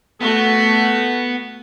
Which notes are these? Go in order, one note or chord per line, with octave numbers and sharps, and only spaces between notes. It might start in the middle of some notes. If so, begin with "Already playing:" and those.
A3 B3 F#4